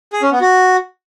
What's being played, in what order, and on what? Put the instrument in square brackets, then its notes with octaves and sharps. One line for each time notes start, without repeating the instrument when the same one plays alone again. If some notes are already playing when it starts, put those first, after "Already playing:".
[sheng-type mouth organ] G#4
C#4
B3
F#4